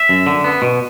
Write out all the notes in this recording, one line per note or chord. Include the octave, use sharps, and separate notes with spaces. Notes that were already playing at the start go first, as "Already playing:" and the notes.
Already playing: E5
F#2
D3
B3
B2